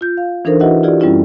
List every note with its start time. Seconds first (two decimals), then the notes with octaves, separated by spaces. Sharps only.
0.01 F4 G6
0.17 F5
0.45 E3 D4 D#4 A4 A#4 C5
0.60 E4 F#4 B4 D#5 E5 F#5
0.83 E4 F4 G4 G#4 D5
1.00 F#2 G3 C4 C#4 E4 F4